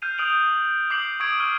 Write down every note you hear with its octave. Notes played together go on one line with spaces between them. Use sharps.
F6 G6 C7 D#7 F7
D#6 G6 D7 F7 F#7
D6 D#6 G6 C7 D7 F#7
C#6 D#6 E6 G#6 D7
F6 C7 D7 D#7 G7